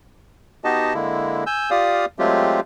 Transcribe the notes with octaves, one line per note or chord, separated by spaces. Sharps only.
B3 D#4 F#4 G4 D#5 A5
D3 G#3 A#3 E4
G#5 E6 G6
F4 G4 D5 F5 D#6
F#3 G#3 A3 C4 F4 G4